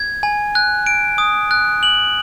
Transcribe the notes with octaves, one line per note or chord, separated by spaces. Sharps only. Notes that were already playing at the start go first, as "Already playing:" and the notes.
Already playing: G#6
G#5
F#6
D7
D#6
F#6
F#7